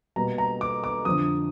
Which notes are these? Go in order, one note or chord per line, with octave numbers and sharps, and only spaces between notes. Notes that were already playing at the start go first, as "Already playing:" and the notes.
B2 G3 A#3 A#5
A#5
D6
D6
F2 D3 F3 D#6